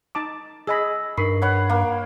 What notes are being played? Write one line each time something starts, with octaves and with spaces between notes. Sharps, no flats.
D#4 A5 D6
G#4 D#5 B5 E6 A#6
G2 D#4 A#4 B5 C#6 C7
B4 C#5 F#5
A#3